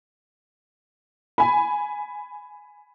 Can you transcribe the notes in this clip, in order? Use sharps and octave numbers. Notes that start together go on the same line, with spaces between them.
G#5 B5